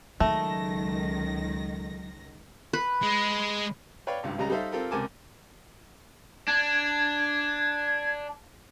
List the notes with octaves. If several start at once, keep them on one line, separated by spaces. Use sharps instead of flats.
C#2 D#3 F#3 A3 A#6
B4
G#3
B4 C#5 D5 F5 G5
G#1 C#2 G2
C#2 C#3 G3 D#5 A#5
G3 D#4 A4 C5 E5 F5
C4 F4 G4 A4 A#4
C#2 C3 A#4 G#5 A5 D6
D4 G#6